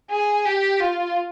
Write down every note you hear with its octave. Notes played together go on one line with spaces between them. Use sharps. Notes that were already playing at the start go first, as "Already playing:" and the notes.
G#4
G4
F4